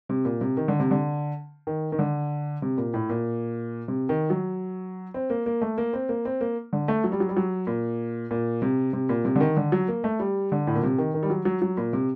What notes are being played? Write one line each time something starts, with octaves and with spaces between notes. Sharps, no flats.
C3
A#2
C3
D#3
D3
C3
D3
D#3
D#3
D3
C3
A#2
A2
A#2
C3
D#3
F#3
C4
A#3
A#3
A3
A#3
C4
A#3
C4
A#3
D3
A3
F#3
G3
F#3
G3
F#3
A#2
A#2
C3
C3
A#2
C3
D3
D#3
D3
F#3
A#3
A3
G3
D3
A2
A#2
C3
D#3
D#3
G3
F#3
F#3
F#3
A#2
C3